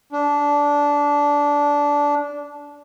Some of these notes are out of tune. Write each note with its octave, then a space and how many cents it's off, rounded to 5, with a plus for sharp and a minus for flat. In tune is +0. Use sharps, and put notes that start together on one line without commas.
D4 -15